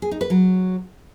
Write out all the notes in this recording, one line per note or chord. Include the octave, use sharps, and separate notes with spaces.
G#4
D#4
B4
F#3